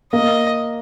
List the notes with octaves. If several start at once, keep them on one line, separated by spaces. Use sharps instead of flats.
A#3 D#5